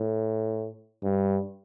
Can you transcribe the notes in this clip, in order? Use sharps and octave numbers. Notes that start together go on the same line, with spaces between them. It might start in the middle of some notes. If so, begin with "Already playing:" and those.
Already playing: A2
G2